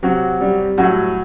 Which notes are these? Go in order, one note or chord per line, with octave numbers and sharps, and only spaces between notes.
C3 F#3 F#4
G3
A2 F#3 F#4